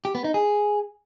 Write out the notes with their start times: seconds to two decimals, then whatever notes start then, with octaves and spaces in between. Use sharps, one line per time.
0.05 G4
0.15 B3
0.24 D#4
0.34 G#4